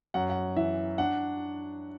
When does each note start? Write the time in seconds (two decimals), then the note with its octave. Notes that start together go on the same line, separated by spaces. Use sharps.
0.14 F#2 F#5
0.30 F#5
0.56 E3 E5
0.98 D4 F#5